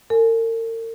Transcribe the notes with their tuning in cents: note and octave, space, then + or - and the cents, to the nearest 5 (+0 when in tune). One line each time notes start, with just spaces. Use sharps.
A#4 -45 G#5 +25